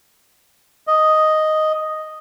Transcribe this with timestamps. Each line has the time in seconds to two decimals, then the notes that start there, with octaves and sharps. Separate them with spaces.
0.87 D#5